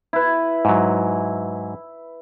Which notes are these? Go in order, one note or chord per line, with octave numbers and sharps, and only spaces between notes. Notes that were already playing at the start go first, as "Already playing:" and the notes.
E4 B4
G#2 F#3